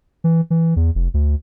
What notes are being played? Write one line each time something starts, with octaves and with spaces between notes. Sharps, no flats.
E3
E3
E2
F1
D2